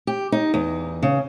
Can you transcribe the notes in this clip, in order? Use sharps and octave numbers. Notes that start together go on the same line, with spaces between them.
G4
D#4
E2
C#3